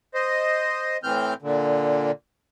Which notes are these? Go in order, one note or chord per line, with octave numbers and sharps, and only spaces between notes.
C5 D#5
A2 E3 C4 F6 G6
A#2 D3